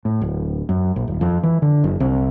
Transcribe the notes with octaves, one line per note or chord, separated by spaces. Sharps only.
A2
D1
F#2
A#1
D#1
F2
E3
D3
F#1
C2